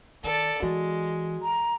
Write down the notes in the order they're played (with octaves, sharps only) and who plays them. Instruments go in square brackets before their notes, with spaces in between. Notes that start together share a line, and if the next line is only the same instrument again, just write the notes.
[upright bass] D#3 [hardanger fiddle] A4 D5
[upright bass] E3 [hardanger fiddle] G#3 [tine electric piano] F#4
[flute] A#5